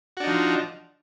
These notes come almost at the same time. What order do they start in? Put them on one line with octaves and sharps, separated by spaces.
F#4 D4 D#4 F3